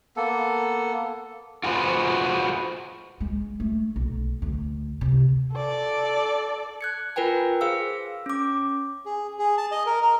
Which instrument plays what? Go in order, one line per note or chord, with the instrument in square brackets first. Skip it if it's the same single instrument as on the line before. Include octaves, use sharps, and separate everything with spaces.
[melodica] A#3 B3 A4
[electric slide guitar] F4 F#4 G#4 B4 C5
[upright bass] G#3
A3
B1
D2
C3
[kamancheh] A4 D5
[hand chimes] F#6 G#6 C#7
F4 A#4 B4 G5 G#5
G#4 C5 F5 E6
C#4 D6
[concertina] G#4
G#4
A5
D#5
A#4
A#4